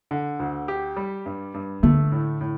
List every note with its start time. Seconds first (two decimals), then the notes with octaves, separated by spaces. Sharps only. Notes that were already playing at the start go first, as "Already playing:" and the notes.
0.11 D3
0.40 D2
0.68 G4
0.96 G3
1.26 G2
1.54 G2
1.83 D3 A3
2.12 A2
2.41 A2